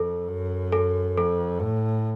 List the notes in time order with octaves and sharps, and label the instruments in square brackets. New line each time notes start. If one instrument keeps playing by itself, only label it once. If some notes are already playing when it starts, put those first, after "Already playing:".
Already playing: [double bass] F2 [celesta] A4
[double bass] F#2
[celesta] A4
[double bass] F2 [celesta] A4
[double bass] A2